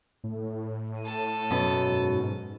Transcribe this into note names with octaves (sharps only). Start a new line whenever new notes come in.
A2
A4 D#7
F#2 B2
G#2